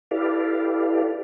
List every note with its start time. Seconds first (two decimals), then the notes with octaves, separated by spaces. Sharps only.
0.11 E4 G4 A4 B4 D5 F5